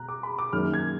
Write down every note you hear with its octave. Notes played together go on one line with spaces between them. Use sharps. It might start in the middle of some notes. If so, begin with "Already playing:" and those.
Already playing: B2 A#5 F#6
D6
B5
D6
F#2 D#3 A#3 F6
G#6